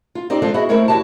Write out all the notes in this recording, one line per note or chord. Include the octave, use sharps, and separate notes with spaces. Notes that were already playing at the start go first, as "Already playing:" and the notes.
F4
C4 D#4 G4 C5 D5
G#3 C4 D4 F4 A4 C5
B3 E4 F#4 G#4 D#5
A3 C4 E4 A#4 C5 C#5
E2 E4 F#4 G4 A5